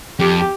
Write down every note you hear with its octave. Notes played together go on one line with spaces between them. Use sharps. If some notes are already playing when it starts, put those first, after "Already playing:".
F2 G4